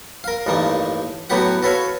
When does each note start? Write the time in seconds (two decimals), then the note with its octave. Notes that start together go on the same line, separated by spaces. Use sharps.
0.24 A#4 F5
0.46 A1 G2 D#3 A#3
1.30 A2 F#3 B3 G4 F#5
1.63 F#4 A4 B4 C#5 F5